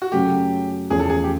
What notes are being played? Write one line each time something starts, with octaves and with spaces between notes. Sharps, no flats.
F#4
F#2 C#3 F#3 A3 G4
E2 C#3 F3 A3 C#4 G#4
A4
G#4
G4